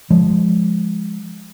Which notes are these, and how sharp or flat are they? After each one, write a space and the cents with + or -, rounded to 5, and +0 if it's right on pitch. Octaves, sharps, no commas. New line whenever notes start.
F3 +0 G#3 +0